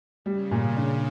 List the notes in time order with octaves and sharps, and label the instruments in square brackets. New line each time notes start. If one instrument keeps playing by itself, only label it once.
[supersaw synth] C#3 [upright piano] G3
[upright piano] A#2
D4